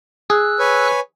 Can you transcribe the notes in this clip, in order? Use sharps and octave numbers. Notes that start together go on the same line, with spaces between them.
G#4 E6 F#6
B4 C#5 G#5